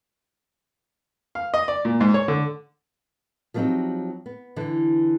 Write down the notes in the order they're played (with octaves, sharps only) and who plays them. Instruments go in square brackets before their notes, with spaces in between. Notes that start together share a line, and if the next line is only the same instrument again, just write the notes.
[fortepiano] F5
D#5
D5
A#2
G#2
C#5
D3
[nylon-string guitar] F3 F#3 B3 C4 D#4 G4
B3
D3 E3